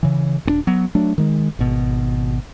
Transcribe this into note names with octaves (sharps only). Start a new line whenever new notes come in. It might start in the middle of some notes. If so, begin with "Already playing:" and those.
C#3 E3
D#1 C4 D4
F#3 B3
F#3 A3 D4
D#3 G#3
G#1 B2